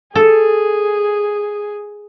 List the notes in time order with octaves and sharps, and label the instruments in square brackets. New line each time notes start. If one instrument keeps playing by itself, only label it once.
[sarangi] G#4 [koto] A4